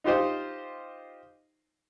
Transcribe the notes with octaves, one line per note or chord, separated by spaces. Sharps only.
D#4 F4 G4 C5 D#5